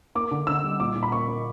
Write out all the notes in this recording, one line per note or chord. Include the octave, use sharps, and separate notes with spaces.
A#3 D6
D3
D3 E6
G3
A#2 D6
A#2
B5
A#3 C#6
A#3